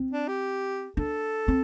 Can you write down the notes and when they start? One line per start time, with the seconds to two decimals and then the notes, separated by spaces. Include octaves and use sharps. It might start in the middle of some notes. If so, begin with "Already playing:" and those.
Already playing: C4
0.11 D4
0.28 G4
0.97 D4 A4
1.48 C4